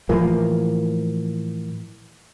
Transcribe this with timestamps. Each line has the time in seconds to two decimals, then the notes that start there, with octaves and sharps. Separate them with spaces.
0.09 A2 E3 F3 A#3